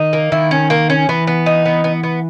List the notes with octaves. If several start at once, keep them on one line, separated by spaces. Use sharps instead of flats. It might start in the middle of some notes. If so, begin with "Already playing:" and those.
Already playing: D#3 D#4
A#3
D#3 E4
C#4
A#3
C#4
E3 B3
B3
D#4
B3
B3
B3